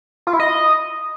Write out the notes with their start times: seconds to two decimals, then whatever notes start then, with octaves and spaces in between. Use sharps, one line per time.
0.27 F4
0.33 E4
0.40 D#5